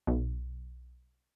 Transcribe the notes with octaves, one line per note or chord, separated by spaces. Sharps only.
B1